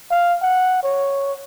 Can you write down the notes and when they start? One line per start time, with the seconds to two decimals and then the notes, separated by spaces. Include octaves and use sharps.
0.10 F5
0.42 F#5
0.83 C#5